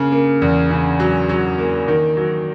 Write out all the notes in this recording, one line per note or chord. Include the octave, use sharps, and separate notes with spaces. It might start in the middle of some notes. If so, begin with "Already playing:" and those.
Already playing: C#3 A#3
A#3
E2
C#3
F#3
F#3
A#3
D#3
F#3